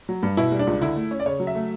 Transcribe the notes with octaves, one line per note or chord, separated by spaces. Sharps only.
F#3
G2
B2 E4
G3
D4
C#2
D3 E4
A3
C#4
D5
C#3 C#5
F#3
E5
A3